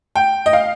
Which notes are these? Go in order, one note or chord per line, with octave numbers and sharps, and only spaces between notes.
G5
D#5
F5